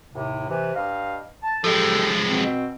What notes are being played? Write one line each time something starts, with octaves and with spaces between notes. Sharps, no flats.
D#2 A2 C3
C3 E3
G2 D#5 F5
A5
F3 G#3 G4 A4
B2 C4